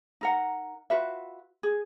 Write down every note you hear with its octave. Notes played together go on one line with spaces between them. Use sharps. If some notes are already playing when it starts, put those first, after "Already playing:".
D#4 A#4 F#5
F4 F#4 B4 E5
G#4